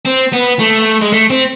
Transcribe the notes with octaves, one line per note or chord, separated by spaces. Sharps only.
C4
B3
A3
G#3
A3
C4